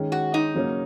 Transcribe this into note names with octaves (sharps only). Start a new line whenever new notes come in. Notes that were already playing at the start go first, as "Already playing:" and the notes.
Already playing: D#3 G#3 C#4
F#4
D#4
C#3 F#3 A#3 C#4